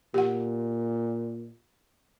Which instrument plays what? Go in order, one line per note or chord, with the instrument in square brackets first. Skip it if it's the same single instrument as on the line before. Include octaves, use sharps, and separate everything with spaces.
[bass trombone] A#2 [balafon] G4 F#5